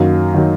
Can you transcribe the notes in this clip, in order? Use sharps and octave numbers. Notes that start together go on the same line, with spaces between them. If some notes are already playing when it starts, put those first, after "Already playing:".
Already playing: F#2 D#3 F#3 A#3
D#3 F#3 A#3